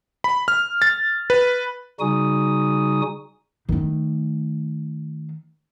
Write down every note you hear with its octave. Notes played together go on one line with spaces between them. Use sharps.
B5
F6
A6
B4
C#3 G3 D#4 F#4 G#5 D#6
D#3 A3